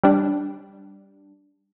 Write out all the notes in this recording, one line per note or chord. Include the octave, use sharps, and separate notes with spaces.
G3 D4